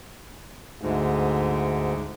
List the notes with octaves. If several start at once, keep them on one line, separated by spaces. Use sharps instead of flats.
D2 G#2